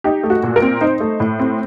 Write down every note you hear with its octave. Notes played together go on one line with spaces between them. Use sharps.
D#4 G4
A3
F#4
A#2
A#4
C4
D#4 C5
A3
A2
C4